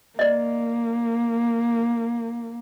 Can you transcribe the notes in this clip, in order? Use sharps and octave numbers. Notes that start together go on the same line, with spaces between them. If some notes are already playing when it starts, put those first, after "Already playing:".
A#3 D5 D#5